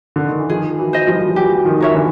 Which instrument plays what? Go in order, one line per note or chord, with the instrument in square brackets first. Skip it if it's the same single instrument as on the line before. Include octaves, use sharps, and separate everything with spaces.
[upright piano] D3
D#3
E3
[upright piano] D#3 F3 [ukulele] G#4
[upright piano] E3 F#3
[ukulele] C5 D#5
[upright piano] F3 G3
E3
F3
[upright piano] E3 F#3 [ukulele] G4
[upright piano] D#3 F3
[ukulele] A#4 C#5 E5
[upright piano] D3 E3